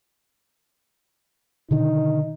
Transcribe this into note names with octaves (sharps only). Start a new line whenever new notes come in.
B2 D3 D#3 D#4